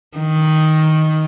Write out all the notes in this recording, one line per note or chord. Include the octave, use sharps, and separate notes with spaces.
D#3